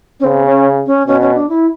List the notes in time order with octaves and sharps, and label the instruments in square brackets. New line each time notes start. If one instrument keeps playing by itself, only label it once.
[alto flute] C#4
[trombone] C#3 [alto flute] C4
[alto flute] C#4
C#4
[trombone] B2 [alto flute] C#4
[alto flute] C#4
D4
E4